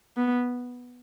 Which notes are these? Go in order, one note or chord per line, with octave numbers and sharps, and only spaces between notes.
B3